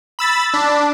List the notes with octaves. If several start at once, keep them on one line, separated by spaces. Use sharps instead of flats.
B5 E6 A6
D4